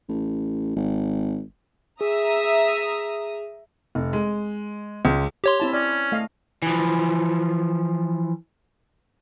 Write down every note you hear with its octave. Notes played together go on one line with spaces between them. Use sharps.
A1
G#1
G#4 E5 A#5 D#6
F1
G#3
C#2
G4 C#5 C6
C4 E4 A5
C#4 D5
A3 D#5 F5
E3 F3